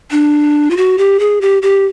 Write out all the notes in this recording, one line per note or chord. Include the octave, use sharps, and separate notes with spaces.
D4
F4
F#4
G4
G#4
G4
G4